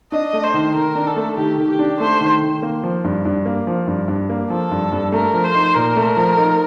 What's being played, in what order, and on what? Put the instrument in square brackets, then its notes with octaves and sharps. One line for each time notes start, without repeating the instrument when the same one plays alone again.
[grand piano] D4 [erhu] D#5
[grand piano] A3
[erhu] C5
[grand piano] D#3
[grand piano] D#3 [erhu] A#4
[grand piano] D4
[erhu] A4
[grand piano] A3
[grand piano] D#3 [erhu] G4
[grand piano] D#3
[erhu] G4
[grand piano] D4
[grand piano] A3 [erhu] C5
[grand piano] D#3
D#3
A#3
F3
G2
G2
A#3
F3
G2
G2
A#3
[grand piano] F3 [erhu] A4
[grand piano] G2
G2
[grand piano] A3 [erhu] A#4
[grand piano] F3
[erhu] C5
[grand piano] D#4
[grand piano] A#2 [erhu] A#4
[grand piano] A3
F3
D#4